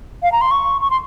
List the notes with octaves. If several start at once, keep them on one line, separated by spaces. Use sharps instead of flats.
F5
A#5
C6
C#6
C#6
C6